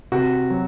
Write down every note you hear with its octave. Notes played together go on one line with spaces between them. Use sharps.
C3 F#4
F#3